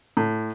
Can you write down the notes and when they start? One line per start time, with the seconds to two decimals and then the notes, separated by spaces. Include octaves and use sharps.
0.17 A2